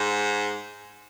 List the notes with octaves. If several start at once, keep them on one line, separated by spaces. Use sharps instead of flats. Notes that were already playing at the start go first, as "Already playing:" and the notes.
Already playing: G#2